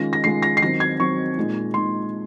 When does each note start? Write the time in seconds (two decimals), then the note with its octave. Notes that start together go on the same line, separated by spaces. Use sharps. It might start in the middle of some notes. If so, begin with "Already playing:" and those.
Already playing: D#3 G#3 C#4 F4 A#6
0.13 A#6
0.24 D#3 G#3 C#4 F4 C7
0.43 A#6
0.57 C7
0.62 D#3 F#3 C4 A#6
0.80 G#6
1.00 D#3 F#3 C4 C#6
1.37 A#2 G#3 D#4
1.74 A#2 G#3 D#4 C6